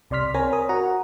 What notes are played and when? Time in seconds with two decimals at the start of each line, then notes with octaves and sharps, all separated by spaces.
0.10 C2 C3 D5 C6 F6 B6
0.34 C4 A#4 C5 C#5 G#5 A#5
0.53 A#4 D#6
0.69 F#4 F#5 A#5